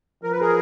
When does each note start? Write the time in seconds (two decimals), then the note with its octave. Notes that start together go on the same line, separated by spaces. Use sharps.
0.23 F3 A#4
0.32 B4
0.40 G#4 A#4